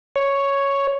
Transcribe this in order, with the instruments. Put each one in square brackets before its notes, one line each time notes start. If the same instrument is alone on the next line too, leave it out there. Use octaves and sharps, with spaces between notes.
[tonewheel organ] C#5